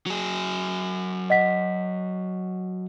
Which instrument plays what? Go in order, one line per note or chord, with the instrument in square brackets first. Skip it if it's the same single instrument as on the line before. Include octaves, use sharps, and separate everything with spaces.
[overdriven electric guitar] F#3 G#4
[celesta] D#5 F#5 B6